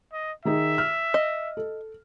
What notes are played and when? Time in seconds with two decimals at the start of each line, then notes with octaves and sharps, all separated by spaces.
0.13 D#5
0.45 D#3 D#4 G#4 E5
0.78 F6
1.14 D#5
1.57 A4